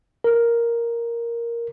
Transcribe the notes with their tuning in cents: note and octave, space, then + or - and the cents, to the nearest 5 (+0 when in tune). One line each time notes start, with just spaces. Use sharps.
A#4 +0